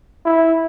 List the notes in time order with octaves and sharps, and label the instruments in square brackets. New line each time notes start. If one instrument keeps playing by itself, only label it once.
[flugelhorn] E4